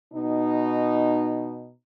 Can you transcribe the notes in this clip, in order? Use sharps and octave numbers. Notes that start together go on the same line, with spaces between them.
B2 D#4